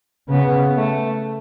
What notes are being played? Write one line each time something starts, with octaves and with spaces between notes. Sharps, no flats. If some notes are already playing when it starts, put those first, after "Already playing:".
C#3 B3
A3